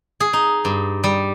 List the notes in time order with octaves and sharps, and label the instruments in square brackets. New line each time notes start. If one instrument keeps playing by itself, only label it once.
[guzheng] G#4
D#4
G2
G3